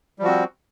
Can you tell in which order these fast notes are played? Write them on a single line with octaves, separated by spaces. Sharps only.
G3 F3 F#4 C4